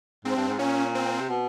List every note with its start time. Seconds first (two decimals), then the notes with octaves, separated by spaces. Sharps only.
0.25 G#2 C4
0.36 G2
0.48 G#2
0.59 A#2 C#4
0.95 C4
1.19 C3
1.29 B2